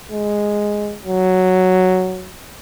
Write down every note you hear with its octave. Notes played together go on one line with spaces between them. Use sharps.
G#3
F#3